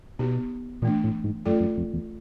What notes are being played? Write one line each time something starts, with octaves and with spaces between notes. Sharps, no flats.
B2 B3 D#4 G4
A#2 E3 A3 D4
A2
G#2
F#2 A3 C#4 F4 A4 D5
F#2
F2
E2